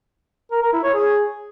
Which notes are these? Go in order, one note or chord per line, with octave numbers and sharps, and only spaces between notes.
A#4
A#4
E4
C#5
G#4